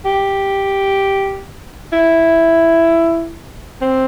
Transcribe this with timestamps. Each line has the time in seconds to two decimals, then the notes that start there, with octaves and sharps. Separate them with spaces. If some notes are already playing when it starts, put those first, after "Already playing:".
0.05 G4
1.93 E4
3.82 C4